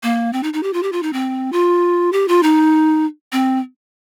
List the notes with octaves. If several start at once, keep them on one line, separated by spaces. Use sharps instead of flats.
A#3
C4
D#4
D#4
G4
F4
G4
F4
D#4
C4
F4
G4
F4
D#4
C4